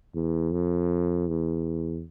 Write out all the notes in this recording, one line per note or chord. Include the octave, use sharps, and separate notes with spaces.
E2
F2
E2